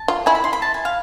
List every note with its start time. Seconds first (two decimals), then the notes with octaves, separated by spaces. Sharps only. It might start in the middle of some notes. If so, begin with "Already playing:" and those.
Already playing: A5
0.08 F4
0.26 E4 G#5
0.35 B5
0.44 C6
0.53 B5
0.62 A5
0.74 G#5
0.85 F5